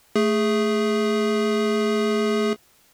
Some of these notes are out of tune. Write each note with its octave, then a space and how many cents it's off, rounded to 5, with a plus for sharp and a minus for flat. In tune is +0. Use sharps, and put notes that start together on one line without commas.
A3 +0 G#4 +0